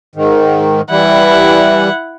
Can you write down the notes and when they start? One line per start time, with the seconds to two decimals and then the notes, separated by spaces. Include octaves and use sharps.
0.16 G#2 D#3
0.90 E3 G3 E4 F#5